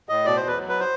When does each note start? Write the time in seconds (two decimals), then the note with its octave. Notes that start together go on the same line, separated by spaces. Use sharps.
0.09 A2 D#5
0.25 B2 D5
0.37 E2 C5
0.47 B4
0.58 F#3
0.69 B4
0.80 C5